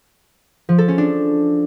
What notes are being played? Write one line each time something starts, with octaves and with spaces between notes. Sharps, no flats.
F3
A4
C#4
D4